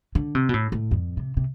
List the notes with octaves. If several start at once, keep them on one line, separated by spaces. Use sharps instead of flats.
D3
C3
B2
A2
A2
F2
C3
C3